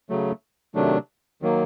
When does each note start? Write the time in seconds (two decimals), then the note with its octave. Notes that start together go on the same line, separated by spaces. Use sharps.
0.10 C#3 F#3 A3
0.75 C3 D#3 F#3 A3 D4
1.42 D#3 F#3 A#3